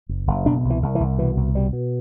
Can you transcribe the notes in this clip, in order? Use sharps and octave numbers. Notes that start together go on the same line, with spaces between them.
F#1
F#1
B2 D4
C2
E3
C2
E3
C2
B2 E3
C2
B2 G3
B2